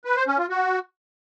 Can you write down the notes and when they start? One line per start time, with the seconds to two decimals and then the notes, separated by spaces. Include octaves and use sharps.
0.05 B4
0.16 C5
0.27 C#4
0.38 F4
0.50 F#4